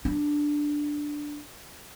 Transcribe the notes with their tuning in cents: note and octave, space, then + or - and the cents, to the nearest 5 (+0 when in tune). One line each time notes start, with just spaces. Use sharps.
D4 +0